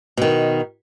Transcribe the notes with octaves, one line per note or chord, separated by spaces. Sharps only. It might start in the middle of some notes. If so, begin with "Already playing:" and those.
B2 D#3